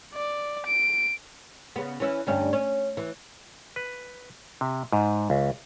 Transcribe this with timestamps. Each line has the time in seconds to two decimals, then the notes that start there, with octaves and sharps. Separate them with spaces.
0.14 D5
0.66 D7
1.76 C#3 B3
2.00 E3 C#4 E4
2.27 D2 G2 C#4
2.53 C#4
2.97 E3
3.76 B4
4.61 C3
4.92 G#2
5.30 C#2